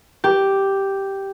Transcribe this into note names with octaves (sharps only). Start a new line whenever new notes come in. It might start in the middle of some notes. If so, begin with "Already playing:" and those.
G4